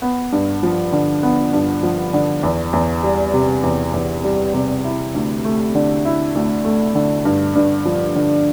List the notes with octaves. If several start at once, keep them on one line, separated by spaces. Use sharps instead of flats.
B3
G2
F3
D3
B3
G2
F3
D3
E2
E2
G3
C3
E2
E2
G3
C3
E4
D2
A3
D3
E4
D2
A3
D3
G2
G2
F3
D3